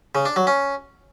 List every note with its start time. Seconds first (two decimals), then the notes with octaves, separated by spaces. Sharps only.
0.15 C#3
0.26 D4
0.36 F#3
0.47 C#4